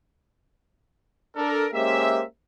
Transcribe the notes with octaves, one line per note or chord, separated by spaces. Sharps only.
D4 A4 A#4
G#3 A#3 C#4 G4 C5 E5